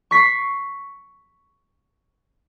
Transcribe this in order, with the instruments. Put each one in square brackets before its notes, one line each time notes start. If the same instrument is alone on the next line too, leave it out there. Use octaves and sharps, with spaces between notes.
[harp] C#6 B6 C7